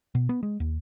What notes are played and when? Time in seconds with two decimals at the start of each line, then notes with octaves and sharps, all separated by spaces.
0.15 B2
0.29 B3
0.43 G#3
0.60 D#2